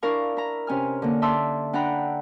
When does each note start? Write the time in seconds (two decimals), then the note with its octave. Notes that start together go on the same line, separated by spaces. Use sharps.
0.03 D4 E4 A#4 F5 C#6
0.37 E4 A#5
0.67 C3 C#4 G#5 F6
1.02 D3 A#3
1.22 E5 A5 C6 D6 E6
1.73 D4 F#5 G5 A#5 B5